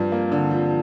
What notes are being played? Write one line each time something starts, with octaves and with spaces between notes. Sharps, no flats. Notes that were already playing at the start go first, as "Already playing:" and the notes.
Already playing: G2 F3
A#3
D3
F3